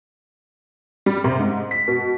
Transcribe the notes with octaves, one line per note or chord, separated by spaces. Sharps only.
G3
C3
G#2
B6
B2